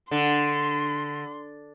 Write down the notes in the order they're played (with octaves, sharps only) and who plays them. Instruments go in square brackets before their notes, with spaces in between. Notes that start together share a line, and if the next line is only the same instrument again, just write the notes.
[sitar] D3 [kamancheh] C6